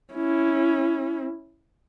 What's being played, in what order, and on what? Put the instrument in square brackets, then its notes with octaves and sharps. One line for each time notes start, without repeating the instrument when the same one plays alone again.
[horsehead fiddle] C#4 E4